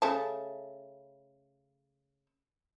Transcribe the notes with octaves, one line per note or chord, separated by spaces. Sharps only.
C#3 A3 A5